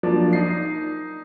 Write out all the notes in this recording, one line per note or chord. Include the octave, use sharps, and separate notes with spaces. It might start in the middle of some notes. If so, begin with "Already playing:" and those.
F3 F#3 A#3 D4
D#4 C7